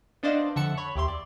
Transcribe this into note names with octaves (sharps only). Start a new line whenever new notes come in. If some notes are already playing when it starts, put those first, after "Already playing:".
B3 D4 C5 D5 D#5 F5
F2 D3 E5 F#5 A5 C#7
C#5 B5
D#2 G4 E5 C6
D5